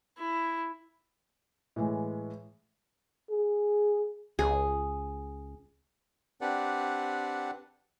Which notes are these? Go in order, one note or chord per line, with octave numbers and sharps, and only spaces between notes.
E4
A2 E3 G#3
G#4
C#2 G#4
C4 D4 G4 B4 D5 F#5